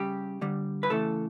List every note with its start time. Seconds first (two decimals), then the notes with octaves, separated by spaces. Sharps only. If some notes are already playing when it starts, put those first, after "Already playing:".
Already playing: C#3 G3 G4
0.41 D3 G3
0.83 B4
0.90 C#3 E3 A3 A4